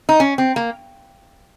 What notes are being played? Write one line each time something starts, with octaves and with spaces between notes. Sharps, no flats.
D#4
C#4
C4
A#3